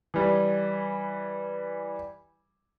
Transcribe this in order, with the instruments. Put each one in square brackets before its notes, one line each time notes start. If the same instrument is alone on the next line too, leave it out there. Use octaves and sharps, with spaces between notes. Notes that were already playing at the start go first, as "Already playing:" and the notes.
[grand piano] E3 G3